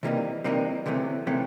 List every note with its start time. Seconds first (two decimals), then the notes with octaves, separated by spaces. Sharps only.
0.03 C3 E3 G3 A#3 D#4
0.44 C3 E3 G3 A#3 D#4
0.86 D2 C3 E3 A3 C#4
1.27 C3 E3 A3 C#4